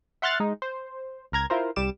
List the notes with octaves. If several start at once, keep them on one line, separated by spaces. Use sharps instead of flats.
E5 F#5 C6 F6 F#6 A6
G#3 D#4
C5
C#2 A#4 A#5 G#6
E4 F4 A#4 C5
C2 G3 D6 E7